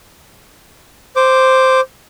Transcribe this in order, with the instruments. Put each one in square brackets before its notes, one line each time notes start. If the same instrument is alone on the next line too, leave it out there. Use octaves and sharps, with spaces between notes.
[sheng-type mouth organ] C5 D6